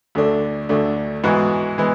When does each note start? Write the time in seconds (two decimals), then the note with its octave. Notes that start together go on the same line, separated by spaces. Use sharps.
0.15 D2 D3 A3 D4
0.69 D2 D3 A3 D4
1.23 G#2 E3 G#3 B3 F#4
1.78 E3 G#3 B3